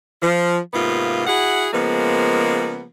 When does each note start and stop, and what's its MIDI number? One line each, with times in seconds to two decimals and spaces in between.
0.22 0.57 53
0.73 1.25 44
0.73 1.25 48
0.73 1.25 58
0.73 1.25 59
0.73 1.25 65
1.27 1.68 64
1.27 1.68 66
1.27 1.68 68
1.27 1.68 78
1.73 2.86 49
1.73 2.86 53
1.73 2.86 56
1.73 2.86 58
1.73 2.86 59